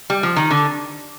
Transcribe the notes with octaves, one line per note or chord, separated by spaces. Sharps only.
G3
F3
D#3
D3